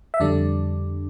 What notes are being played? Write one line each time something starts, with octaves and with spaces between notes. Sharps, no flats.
E5
F2 D3 G3 D4 D5